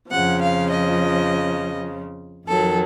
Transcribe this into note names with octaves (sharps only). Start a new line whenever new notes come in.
F2 C#3 F3 F#5
F5
D#5
F2 D#3 F#3 A4